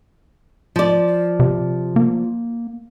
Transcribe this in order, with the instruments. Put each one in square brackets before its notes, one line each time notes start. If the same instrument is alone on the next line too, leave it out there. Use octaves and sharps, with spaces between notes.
[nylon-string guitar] F3 D5
[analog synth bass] C3
A#3